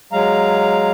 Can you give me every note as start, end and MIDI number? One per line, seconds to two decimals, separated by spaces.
0.12 0.92 54
0.12 0.92 56
0.12 0.92 77
0.12 0.92 82